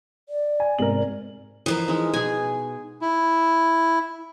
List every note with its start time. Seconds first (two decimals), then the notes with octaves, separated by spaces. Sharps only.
0.29 D5
0.60 G#5
0.79 G#2 C3 A#4 F#7
1.66 E3 F3 A#4 D#5
1.88 G#3 D#4
2.14 B2 G#4 G#5
3.01 E4